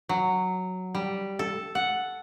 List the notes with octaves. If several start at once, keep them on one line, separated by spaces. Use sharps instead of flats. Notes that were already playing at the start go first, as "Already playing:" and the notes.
F#3
G3
A4
F#5